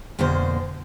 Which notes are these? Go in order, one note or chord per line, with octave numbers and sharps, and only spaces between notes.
F2 B2 D3 A#3 C5